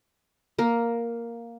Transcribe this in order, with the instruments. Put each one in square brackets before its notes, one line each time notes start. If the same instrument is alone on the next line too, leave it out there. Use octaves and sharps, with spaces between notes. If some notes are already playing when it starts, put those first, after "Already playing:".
[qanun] A#3 A#4